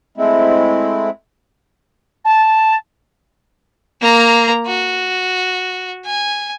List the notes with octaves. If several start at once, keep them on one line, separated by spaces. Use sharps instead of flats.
G#3 A3 C4 E4
A5
A#3 A#5
F#4
G#5